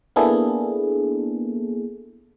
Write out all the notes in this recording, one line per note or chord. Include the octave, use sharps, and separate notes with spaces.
A#3 B3 D4 E4 G#4 A4